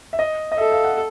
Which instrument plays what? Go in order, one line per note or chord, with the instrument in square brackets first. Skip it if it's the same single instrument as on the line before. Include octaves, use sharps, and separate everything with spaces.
[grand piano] E5
D#5
D#5
[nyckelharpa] A4 [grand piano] E5
[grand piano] F5
F#5